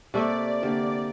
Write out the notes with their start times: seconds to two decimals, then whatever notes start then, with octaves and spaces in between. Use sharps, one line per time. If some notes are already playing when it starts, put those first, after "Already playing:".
0.14 C3 A3 A#3 D5 E5
0.62 D3 A#3 G4